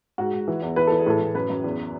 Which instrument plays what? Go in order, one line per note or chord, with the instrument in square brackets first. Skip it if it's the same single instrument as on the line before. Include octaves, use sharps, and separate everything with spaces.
[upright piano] G#2 F#4
G#2
E3
E2
E3 B4
E3 A4
G#4
A2 A4
A2
F#2 B4
F#2
E2